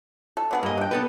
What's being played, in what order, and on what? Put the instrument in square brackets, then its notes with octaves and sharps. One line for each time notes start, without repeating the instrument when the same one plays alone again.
[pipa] A4
D3 B3 G#4
[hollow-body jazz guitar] G2 D#5 [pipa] A#3
[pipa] D4 G5
[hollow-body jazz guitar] B3 A4 B4